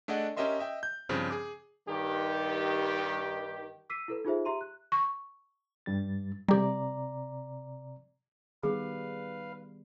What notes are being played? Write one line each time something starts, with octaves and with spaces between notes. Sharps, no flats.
A3 D4 G#4 D5 D#5 F#5
C#4 G4 A#4 D#5 E5 C6
D#5 E5 G5
G6
G2 C#3 F3 C4
G#4 D6
G2 D#3 G4
D6 E6 B6 C7 D#7
E4 A4 B4
D#4 F4 G#4 C5 E5
G4 E5 A#5 C6 D#7
F#6
C#6
G2 G3 A6
C3 G3 G4 D5 A#5
D#3 G3 B3 G#4 B4 F5